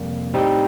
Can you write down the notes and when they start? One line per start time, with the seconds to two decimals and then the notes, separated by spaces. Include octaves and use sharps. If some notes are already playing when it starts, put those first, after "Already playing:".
Already playing: F2 C3 G3 A#3
0.34 A2 G3 C4 D#4